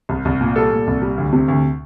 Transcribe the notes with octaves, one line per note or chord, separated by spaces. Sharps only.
C2
C2
A#2
G3 A4
A#2
C2
G3
D2
C3
D2